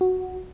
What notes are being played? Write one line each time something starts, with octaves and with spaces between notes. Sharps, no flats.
F#4